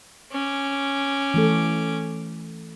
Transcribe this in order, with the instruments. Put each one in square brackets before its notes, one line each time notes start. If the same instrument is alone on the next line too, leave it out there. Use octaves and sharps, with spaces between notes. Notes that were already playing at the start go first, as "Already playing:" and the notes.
[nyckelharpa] C#4 D6
[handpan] E3 A3 A4